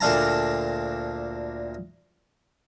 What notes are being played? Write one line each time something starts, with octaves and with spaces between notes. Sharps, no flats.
D2 A#2 D4 F5 A5 A#5